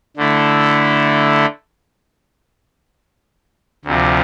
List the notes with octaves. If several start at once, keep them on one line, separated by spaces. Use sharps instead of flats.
D3 A3 E4
D2 C3 F3